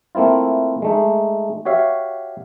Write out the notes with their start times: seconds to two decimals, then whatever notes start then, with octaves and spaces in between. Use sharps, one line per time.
0.15 A3 A#3 C4 E4 F4
0.82 G#3 A3 D#4
1.65 F#4 G4 C#5 E5 F5